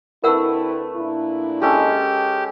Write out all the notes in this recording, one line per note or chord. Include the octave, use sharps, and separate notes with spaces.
D2 A3 C4 E4 A#4 B4 F#5 E6
A#2 D4 E4
G#3 C#4 G4 A4